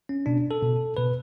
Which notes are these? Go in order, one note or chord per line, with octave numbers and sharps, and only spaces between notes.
C#4
B2 D4
A4
B2
B2 B4